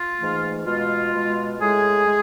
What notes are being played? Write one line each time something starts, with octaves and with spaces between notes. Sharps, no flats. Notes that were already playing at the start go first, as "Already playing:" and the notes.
Already playing: F4
G#2 E3 A3
B2 G#3 F4
B2 G#3
A2 G#3 G#4
G#3